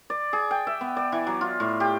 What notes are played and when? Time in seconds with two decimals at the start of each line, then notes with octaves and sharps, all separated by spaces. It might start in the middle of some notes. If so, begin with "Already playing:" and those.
0.10 D5
0.33 G#4
0.51 G5
0.67 E5
0.81 B3
0.97 D5
1.12 E3
1.27 F#3
1.41 F4
1.60 A2
1.80 G4